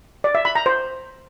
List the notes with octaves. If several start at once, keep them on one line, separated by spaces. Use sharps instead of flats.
D5
E5
B5
A#5
C5